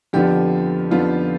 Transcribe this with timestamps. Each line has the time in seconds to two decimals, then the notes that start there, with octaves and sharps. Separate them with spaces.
0.13 F2 D3 F3 B3 D4 G4
0.91 F2 D3 F3 B3 D4 F4